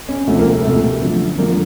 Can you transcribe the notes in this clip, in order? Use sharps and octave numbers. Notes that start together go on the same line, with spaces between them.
C#4
D2 C3 F3 A3
A#3
A3
D2 C3 F3 A3
F#2 D3 F3
F#2 D3 F3 A#3